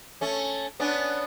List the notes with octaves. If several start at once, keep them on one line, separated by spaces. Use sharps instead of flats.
A3 C#4
B3 C#4 D4